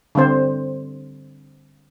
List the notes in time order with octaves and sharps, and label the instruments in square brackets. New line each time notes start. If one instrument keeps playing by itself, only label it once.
[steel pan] D3 G3 C4 C5